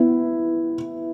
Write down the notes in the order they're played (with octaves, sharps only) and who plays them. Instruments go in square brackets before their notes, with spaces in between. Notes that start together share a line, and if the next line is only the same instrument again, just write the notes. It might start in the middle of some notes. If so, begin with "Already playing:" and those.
Already playing: [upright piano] B3 E4